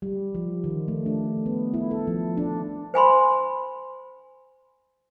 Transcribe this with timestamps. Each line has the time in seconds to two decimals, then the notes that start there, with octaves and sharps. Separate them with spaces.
0.02 G3
0.35 F3
0.64 D#3
0.88 A3
1.06 D4
1.46 B3
1.74 E4
1.91 A4
2.07 F3
2.37 D4
2.94 C5 G#5 B5 C6